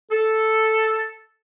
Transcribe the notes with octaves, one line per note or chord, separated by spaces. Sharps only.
A4